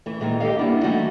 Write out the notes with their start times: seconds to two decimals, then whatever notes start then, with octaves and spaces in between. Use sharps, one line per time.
0.06 E3 A3
0.20 A#2 D#3 E3 G#3 A3
0.40 G4 A4 D#5 F5
0.59 G3 A#3 B3 D4 E4
0.83 E3 G3 A3 D#4 F#4